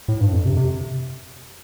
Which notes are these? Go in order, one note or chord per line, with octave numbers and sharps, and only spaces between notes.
A2
G2
F2
C3
C3